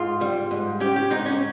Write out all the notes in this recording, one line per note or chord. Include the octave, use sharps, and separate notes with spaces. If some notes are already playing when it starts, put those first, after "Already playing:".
Already playing: G#2 F4
G3
G#2
C#4 G4
G4
G#2 D#4
C#4